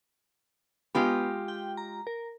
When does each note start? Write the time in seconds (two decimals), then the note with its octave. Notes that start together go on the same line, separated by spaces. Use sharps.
0.95 G#3 B3 F4 G4
1.48 G5
1.77 A#5
2.07 A#4